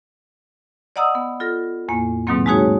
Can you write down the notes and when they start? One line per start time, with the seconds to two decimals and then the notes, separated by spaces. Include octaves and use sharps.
0.96 D5 D#5 F#5 A#5 D#6 E6
1.15 B3
1.40 F4 A4 A#6
1.88 E2 A2 A#3
2.27 G#2 B2 D#3 F#3 A#3 C4
2.46 G#3 A3 D#4 F#4 G#4 C#5